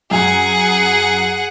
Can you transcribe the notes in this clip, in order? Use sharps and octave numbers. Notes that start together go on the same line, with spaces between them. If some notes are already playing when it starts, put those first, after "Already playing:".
F#2 G#4 F#5 G#5